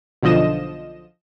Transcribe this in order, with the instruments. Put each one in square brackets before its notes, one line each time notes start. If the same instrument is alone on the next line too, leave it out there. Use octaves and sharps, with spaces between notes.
[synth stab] B1 D3 F3 D#5 E7